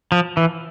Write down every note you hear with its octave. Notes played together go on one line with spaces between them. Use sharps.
F3
E3